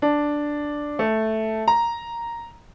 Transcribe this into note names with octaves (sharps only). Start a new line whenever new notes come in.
D4
A3
A#5